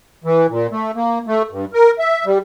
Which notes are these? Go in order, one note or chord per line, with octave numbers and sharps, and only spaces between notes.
E3
A#2
A3
A#3
A3
G2
A#4
E5
G3